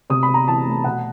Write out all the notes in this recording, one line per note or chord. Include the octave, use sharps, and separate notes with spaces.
C3 D#6
B5
C3
A#5
E3 A5
A3
B2 F#5